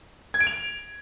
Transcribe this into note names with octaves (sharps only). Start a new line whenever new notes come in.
G#6
D7
F7